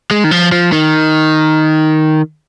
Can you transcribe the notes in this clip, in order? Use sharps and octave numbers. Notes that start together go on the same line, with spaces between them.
G#3
D#3
F3
F3
D#3